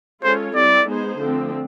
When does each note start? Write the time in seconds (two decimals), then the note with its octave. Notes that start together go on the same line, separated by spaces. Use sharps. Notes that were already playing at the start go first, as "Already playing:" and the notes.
0.23 G#3 C#4 F4 A4 C5 C#5
0.55 G3 C4 E4 D5
0.87 G#3 B3 D#4 G#4 C5
1.20 D3 F3 A3 C4